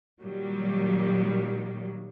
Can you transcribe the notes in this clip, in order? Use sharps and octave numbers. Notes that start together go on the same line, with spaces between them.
A#2 D#3 F#3 G3